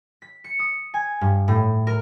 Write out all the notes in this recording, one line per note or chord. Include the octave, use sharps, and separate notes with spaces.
B6
C#7
D#6
G#5
G2
A2
A#4